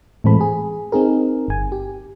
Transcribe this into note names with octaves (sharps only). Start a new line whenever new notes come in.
A2 E3 G#3 C4 A4 B5
G#4
C4 D#4 G#4 A#4
G1 G#5
G4